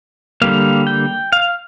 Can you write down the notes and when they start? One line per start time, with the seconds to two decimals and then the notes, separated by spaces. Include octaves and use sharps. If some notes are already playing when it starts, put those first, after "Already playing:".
0.42 D3 G3 A#3 F5
0.87 G5
1.33 F5